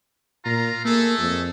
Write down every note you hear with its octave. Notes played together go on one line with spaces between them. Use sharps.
A#2 F4 A#5
A3 A#3 G#4 A4
F2